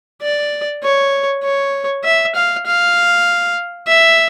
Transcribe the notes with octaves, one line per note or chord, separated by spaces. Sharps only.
D5
C#5
C#5
E5
F5
F5
E5